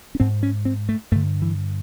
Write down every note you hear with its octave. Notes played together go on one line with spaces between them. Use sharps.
C#4
G#2 C4
C#4
C4
A3
G2 D3 A3
E3